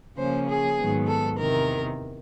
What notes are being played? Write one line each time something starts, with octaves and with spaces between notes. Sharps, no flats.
C#3 F3 A#3 C#4 C5
G#4
G#2 D#3 F#3 B3
A4
E2 C3 D#3 A#4